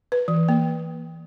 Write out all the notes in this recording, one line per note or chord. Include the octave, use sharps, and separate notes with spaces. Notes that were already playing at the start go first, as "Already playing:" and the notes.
B4
E3
A#3